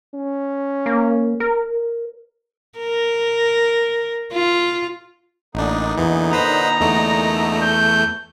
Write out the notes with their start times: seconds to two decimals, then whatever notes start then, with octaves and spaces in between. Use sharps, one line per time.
0.15 C#4
0.86 A#3
1.40 A#4
2.79 A#4
4.33 F4
5.55 A1 A#2 D3 D4 D#4
5.97 E2 E3
6.33 B4 C5 A#5 B5
6.81 E2 A3
7.62 G6